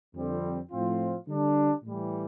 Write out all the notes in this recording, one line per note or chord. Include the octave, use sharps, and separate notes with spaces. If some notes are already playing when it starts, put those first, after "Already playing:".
F2 D3 G3 C4
A2 F3 C4 F4
D3 G3 D4
A2 E3 G3